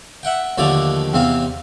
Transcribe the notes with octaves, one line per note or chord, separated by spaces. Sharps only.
E5 F#5 G5
D#2 D3 F3 A3 D5 D6
E2 C3 C4 F5